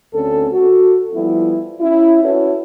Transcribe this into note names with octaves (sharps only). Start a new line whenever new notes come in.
D2 D3 C4 C#4 A4
F#4 A4
F3 G3 B3 E4
C#4 E4
C#4 E4 F#4 A4 B4 C#5